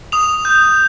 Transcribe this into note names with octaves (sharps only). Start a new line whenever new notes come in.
D#6 F7
G6